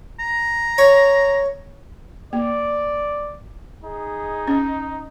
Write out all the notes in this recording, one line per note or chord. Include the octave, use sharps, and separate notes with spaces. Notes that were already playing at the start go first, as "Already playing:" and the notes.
A#5
C#5
A#3 D5
D#4 G#4
C#4